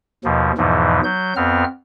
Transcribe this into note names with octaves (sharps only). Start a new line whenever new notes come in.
D#2 B2 F3
E2 G#2 B2 E3 F3
F#3 G6
F2 B3 C4 F6